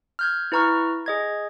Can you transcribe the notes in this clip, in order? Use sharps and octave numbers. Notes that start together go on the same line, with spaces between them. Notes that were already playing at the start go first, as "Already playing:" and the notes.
F6 G6 G#6
E4 B4 A#5 C#6 F6
G#4 D#5 G#6